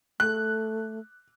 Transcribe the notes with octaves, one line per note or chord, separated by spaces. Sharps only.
A3 F#6